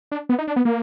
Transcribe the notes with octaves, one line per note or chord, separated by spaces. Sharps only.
D4
B3
D#4
D4
B3
A#3